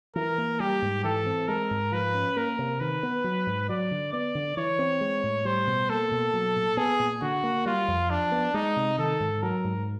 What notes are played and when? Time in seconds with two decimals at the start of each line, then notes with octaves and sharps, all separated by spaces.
0.15 E3 A#4
0.38 A#3
0.60 G3 G4
0.82 G#2
1.04 E3 A4
1.26 C4
1.48 G#3 A#4
1.71 G#2
1.92 F3 B4
2.14 C#4
2.36 A#3 A#4
2.59 C3
2.80 D#3 B4
3.03 B3
3.24 F#3
3.47 G#2
3.68 F#3 D5
3.91 D3
4.12 B3 D5
4.35 D3
4.57 E3 C#5
4.79 C4
5.01 G#3
5.23 A2
5.45 G3 C5
5.67 B2
5.89 A#3 A4
6.12 B2
6.34 F#3
6.56 A#2
6.77 B3 G#4
7.00 A#2
7.22 D3 F#4
7.43 A#3
7.66 G3 F4
7.88 F2
8.10 F3 D4
8.32 B3
8.54 G#3 D#4
8.76 C3
8.98 D#3 A4
9.20 G#2
9.42 F#3 A#4
9.64 G#2